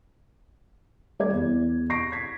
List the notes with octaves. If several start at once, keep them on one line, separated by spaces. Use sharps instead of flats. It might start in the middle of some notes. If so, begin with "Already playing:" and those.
G3 D5 G#6
E2
C#6 A#6 C7 D7
G#6 B6